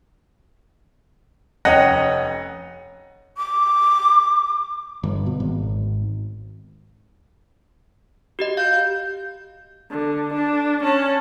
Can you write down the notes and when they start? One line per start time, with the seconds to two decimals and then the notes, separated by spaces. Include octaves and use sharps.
1.65 F1 C#4 D#5 F#5 G5 A#6
3.37 D6
5.03 G1
5.26 B2
5.40 G#1
8.39 F#4 G4 D#5
8.57 F5 G6
9.91 D3
10.34 D4
10.83 C#4 A5